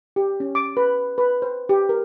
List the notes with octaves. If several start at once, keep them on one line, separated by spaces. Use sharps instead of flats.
G4
C#4
D6
B4
B4
C5
G4
A#4